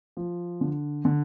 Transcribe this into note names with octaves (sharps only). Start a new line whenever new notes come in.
F3
D3
D3